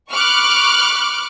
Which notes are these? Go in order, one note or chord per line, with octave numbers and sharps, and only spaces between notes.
B5 C#6 D6 F6 F#6